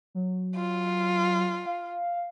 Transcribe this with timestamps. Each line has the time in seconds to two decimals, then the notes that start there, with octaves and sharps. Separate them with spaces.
0.15 F#3
0.56 F4
1.66 F5